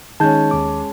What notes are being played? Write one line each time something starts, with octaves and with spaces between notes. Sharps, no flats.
D#3 G#3 C#4 D#4 A5 G6
D#2 D6